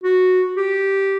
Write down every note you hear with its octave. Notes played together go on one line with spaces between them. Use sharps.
F#4
G4